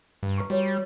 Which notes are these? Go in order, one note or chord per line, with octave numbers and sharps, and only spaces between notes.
G2
B4 A#5 C#6
G3 F#4 C#5